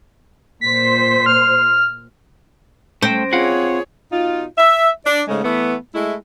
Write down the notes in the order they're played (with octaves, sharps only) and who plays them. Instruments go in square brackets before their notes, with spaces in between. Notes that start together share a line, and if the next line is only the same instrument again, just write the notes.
[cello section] A#2 C5 [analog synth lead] B6
[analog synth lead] F6
[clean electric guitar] A3 G5 [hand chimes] C#4 A#6 D7 [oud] C5
[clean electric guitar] C4 F5 F#5 [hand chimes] F4 [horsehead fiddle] G#4 C#5
[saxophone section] B2 D#4 F4
E5
D4 D5
G#2 C#3 G#3 A3
E3 A3 B3
G#3 A3 E4